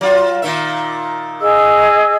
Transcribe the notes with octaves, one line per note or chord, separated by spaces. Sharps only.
F#3 F4
A#2 D#3 E5
G#4 D#5 E6